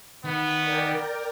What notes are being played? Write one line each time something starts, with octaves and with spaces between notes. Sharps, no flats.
D#3 B3
A#4 D5 G5